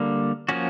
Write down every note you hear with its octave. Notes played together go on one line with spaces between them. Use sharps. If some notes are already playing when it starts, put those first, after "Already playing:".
Already playing: D3 G3 A#3
F3 A#3 C#4 F#4